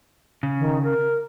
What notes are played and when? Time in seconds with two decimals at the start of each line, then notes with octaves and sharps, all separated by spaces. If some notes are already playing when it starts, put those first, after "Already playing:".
0.43 C#3
0.59 D#3
0.83 A#4